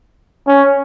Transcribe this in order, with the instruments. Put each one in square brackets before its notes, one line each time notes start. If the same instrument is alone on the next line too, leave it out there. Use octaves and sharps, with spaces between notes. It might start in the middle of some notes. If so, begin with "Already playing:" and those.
[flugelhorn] C#4